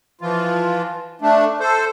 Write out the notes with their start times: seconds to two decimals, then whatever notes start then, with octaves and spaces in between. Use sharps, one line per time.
0.21 E3 F3 F4
1.22 A3 D4
1.60 A4 C5